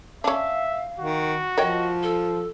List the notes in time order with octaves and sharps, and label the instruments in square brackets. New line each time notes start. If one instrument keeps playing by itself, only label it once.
[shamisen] C#4 D4 [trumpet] E5 [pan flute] F5
[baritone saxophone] D#3 [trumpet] F#4
[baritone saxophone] F3 [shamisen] A#4 C#5 G5 [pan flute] D#5
[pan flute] A4